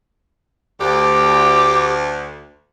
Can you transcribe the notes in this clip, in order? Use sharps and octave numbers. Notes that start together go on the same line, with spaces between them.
D2 G4